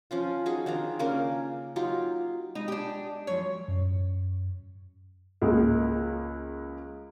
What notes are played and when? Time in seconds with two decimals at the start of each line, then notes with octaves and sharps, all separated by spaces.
0.11 F3 C#4 F4
0.46 D#4 F#4 G#4
0.66 D#3 D4 F4 A#5
0.99 C#3 A#3 C#4 A#4
1.76 F#3 D#4 F4 G4
2.55 G#3 D#4
2.68 D4 G4
3.27 F#2 F3 C#5
3.68 F#2
5.42 C#2 G#3 A#3